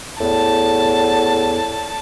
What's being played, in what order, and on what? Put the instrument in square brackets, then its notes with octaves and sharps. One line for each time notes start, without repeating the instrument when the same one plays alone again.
[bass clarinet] E2 [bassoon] A2 [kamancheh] A5